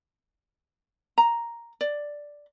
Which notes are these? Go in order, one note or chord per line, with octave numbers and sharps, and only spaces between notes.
A#5
D5